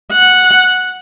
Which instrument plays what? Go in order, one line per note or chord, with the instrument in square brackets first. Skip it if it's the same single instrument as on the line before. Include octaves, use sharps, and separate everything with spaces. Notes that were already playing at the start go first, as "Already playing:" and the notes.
[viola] F#5